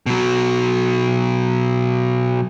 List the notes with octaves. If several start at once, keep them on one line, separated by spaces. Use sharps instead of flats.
B2 F#3